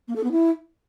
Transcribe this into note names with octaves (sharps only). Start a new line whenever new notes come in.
A#3
A4
B3
E4